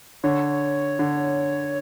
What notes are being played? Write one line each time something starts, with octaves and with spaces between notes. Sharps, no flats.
D3 C#5
D3